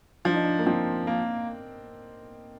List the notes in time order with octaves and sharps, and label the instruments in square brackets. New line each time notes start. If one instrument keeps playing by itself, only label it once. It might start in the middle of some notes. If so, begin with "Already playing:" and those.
[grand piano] F3 [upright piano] D4
[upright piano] D#4
D4
A#3
[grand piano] F3 [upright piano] C4
[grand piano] A#3